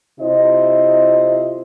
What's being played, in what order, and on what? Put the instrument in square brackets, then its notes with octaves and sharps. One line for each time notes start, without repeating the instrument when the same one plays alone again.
[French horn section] C3 E4 F4 C5 D#5